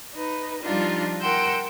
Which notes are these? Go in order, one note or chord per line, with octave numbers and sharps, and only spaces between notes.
D#4 B4
F3 G3 D4 D#4 F4
A#4 F#5 G5 C6 E6 G6